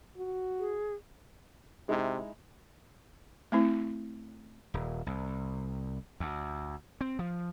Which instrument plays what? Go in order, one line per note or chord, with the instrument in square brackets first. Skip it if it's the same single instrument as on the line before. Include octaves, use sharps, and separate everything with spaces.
[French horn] F#4
[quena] G#4
[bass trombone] C3 [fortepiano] G#3 D#4 E4
[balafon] A3 C4 E4
[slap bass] D#1
C2
D2
C4
F3